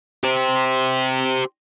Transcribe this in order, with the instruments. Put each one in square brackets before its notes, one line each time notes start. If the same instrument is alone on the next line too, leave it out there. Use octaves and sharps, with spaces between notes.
[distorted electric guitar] G4 C5